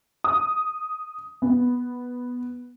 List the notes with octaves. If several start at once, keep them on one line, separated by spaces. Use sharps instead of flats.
D#6
B3